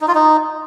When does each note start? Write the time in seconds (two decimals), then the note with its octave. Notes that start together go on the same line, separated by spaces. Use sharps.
0.01 D#4
0.08 F4
0.15 D#4